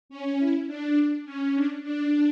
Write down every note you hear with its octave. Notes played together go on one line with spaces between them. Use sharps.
C#4
E4
D4
C#4
D4
D4